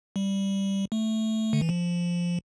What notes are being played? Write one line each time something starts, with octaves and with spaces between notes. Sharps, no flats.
G3
A3
D3
E3
F3